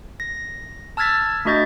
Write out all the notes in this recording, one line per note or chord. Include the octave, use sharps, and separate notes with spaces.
A#6
A5 E6 F6 G#6 A6 B6
A3 D4 F#4 D#5 G6 A6